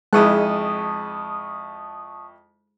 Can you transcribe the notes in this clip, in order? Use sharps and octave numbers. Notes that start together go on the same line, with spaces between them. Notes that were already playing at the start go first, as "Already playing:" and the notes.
F2 G#3 E4 A5 C#6 D#6 F#6